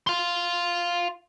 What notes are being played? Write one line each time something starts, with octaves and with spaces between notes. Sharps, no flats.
F5 C6